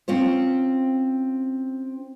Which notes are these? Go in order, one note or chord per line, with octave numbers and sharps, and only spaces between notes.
C4 C#4 F4 C5